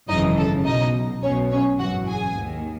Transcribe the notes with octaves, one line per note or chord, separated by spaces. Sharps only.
G#1 F#2 C#3 E3 D#4 D#5
A4
B1 B2 D#4 D#5
B1 B2 C#4 C#5
C#4 C#5
G#1 F#2 E3 F#4 F#5
G#4 G#5
D#2 D#3